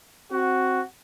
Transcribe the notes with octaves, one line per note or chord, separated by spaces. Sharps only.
C4 F#4